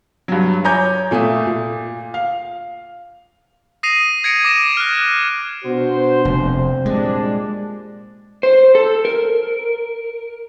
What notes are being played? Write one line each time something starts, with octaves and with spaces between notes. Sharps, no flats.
G2 F#3
C#5 G#5 A#5 D6 G6
A#2 A3 E5 D#6
A#2
F5
D#6 A#6 C7 D#7 F7
G#6 A#6 C#7 D7 F7
D6 A#6 E7
F6 F#6
B2 D4 F#4 C5
F1 C4
A#2 G3 G#3 D4
C5
A4
A#4